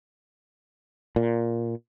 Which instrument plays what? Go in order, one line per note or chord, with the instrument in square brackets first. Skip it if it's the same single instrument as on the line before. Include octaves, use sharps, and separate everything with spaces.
[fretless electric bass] A#2